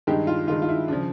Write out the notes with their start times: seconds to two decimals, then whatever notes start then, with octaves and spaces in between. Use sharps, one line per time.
0.07 G2 D#3 G#3 G4
0.27 F4
0.48 G2 D#3 G#3 F4
0.62 F4
0.69 E4
0.88 C#3 F3 D4